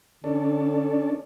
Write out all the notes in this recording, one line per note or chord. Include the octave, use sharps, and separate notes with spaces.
D3 C#4 D4 A4